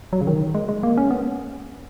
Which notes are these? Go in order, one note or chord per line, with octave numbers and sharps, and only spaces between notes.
F#3
C#3
D#3
G#3
G#3
A#3
C#4
B3